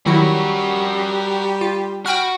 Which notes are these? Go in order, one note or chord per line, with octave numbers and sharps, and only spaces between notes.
D#3 F#3 G3 E4 F#4 A#4
F4
F#4 G5 B5 F6